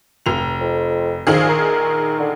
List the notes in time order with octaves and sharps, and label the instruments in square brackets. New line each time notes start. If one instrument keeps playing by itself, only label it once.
[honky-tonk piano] F1 F7
[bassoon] F2
[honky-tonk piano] A#1 D#3 G#4 [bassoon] F3
[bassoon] A#4
D3